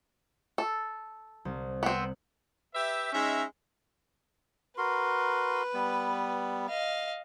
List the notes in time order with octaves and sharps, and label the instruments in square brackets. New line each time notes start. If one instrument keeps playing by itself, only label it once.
[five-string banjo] A4
[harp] C2
[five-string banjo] B3 C4
[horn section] G4 B4 E5
G#3 C#4 D#4 E5
[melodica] F#4 A#4 C6 [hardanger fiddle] B4
[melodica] G3 B3
[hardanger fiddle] D#5 F5